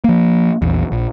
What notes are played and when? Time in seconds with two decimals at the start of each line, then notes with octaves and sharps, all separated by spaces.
0.04 F3 A#3
0.62 A#1 E2
0.92 A#1